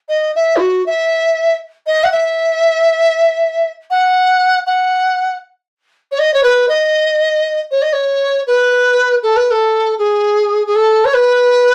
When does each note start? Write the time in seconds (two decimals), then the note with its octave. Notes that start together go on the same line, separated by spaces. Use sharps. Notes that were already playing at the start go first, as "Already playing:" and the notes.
0.09 D#5
0.35 E5
0.57 E4
0.60 F#4
0.86 E5
1.87 D#5
2.04 F#5
2.12 E5
3.91 F#5
4.67 F#5
6.12 C#5
6.19 D#5
6.34 C#5
6.43 B4
6.69 D#5
7.71 C#5
7.82 D#5
7.93 C#5
8.47 B4
9.23 A4
9.36 B4
9.51 A4
9.99 G#4
10.67 G#4
10.75 A4
11.05 C#5
11.14 B4